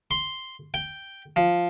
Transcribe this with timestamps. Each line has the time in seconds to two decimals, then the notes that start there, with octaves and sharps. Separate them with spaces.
0.11 C6
0.74 G5
1.36 F3